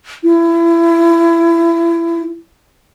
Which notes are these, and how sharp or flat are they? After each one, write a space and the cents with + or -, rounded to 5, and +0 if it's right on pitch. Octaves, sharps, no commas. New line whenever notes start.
E4 +30